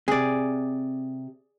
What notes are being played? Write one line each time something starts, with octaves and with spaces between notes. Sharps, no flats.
C3 G#4 D5